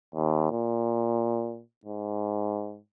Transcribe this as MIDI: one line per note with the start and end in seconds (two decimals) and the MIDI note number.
0.15 0.51 39
0.52 1.62 46
1.85 2.79 44